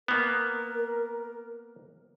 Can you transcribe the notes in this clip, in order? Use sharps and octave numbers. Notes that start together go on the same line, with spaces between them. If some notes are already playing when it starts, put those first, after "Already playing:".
A#3 B3 A#4